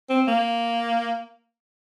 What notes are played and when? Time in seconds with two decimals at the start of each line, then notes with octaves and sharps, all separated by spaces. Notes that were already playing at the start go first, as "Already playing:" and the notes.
0.09 C4
0.28 A#3